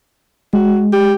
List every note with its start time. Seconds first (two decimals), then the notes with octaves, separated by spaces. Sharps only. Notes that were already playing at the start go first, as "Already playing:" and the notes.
0.53 G#3 F#4
0.93 G4